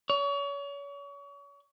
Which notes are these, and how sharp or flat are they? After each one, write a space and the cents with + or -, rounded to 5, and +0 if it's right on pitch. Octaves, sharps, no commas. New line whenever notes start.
C#5 +35